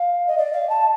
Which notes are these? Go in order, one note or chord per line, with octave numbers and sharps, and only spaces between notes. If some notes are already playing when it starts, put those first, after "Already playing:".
Already playing: F5
D#5
D5
F5
A5